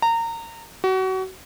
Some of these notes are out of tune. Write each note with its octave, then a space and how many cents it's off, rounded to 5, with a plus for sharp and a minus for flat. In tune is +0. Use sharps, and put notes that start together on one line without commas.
A#5 -25
F#4 +30